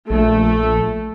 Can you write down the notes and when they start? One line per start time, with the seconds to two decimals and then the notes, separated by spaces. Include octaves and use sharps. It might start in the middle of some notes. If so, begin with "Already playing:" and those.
0.10 A#1 A3